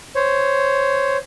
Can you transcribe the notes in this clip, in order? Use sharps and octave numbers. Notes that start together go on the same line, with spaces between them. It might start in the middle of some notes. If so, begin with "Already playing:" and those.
C5 C#5